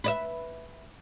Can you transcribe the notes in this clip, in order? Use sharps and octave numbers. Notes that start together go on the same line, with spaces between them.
B4 D#5 E5